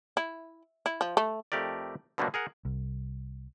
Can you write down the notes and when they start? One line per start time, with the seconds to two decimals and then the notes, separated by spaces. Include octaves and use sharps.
0.17 E4
0.86 E4
1.01 F3
1.17 A3
1.52 F2 A3 G4 A#4 D5
2.18 B2 D3 F#3 G3 A3 A#3
2.34 G#4 A#4 F#5
2.65 C2